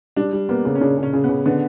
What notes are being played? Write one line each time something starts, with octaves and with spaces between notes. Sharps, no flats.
G3 D4
G3
A#3 B3
C#3
C#4
C#3 D4
C#3
C#4
C#3
B3
C#3
D3 B3